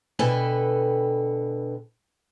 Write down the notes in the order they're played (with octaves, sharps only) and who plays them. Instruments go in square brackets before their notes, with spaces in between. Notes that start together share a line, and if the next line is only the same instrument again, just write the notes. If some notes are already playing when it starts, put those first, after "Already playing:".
[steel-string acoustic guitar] B2 D3 A4 B4 G5 G#5